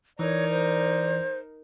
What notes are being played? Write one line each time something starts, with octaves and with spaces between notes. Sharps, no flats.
E3 D#4 A#4 C#5 D5
C5